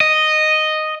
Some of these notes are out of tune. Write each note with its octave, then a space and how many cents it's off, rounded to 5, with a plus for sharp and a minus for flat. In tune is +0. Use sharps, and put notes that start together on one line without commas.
D#5 -5